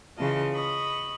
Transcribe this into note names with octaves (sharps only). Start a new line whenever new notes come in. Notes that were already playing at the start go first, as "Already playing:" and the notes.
C#3 E3 F4 D#5 A5
D#5 B5 C#6